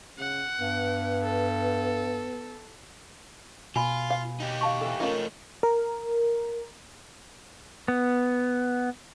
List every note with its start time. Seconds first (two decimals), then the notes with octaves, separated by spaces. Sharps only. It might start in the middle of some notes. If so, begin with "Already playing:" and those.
0.18 C#3 F#5
0.59 G2 B3
1.23 A4
3.76 B2 F4 G#5 B5
4.10 F5
4.40 D#4 G4
4.61 F5 A5 C#6
4.81 E3 A4
5.00 A3 C#4 D#4 F4 A#4
5.63 A#4
7.88 B3